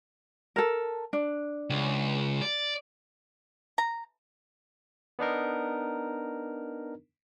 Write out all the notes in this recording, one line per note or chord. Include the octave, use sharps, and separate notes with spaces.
A4 A#4
D4
C#2
D5
A#5
B3 D4 D#4 A#4